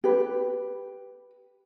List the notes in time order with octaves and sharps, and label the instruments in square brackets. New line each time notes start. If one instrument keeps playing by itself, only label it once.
[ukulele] G4 B4